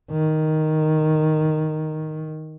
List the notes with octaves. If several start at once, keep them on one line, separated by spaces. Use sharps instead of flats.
D#3